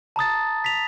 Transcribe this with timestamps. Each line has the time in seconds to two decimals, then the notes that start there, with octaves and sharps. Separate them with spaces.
0.16 A5 A#5 D#6 A6
0.64 B6 F7